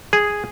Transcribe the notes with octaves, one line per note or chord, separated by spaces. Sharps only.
G#4